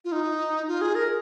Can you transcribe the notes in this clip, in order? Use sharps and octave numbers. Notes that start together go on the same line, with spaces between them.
F4
D#4
F4
G#4
A#4